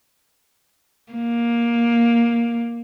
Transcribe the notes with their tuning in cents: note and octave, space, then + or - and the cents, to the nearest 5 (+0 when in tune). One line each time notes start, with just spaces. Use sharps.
A#3 +10